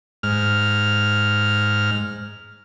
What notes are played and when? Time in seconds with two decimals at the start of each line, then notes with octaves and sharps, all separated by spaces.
0.23 G#2 F6